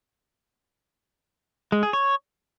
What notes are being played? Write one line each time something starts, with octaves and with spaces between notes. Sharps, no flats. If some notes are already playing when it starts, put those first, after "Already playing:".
G#3
G#4
C#5